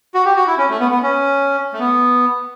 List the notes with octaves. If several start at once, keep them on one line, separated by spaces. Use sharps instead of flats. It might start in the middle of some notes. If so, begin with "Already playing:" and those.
F#4
G4
F#4
E4
C#4
A3
B3
B3
C#4
A3
B3